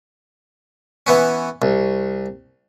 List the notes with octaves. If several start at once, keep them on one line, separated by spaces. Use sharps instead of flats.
E3 B3 C#4
C2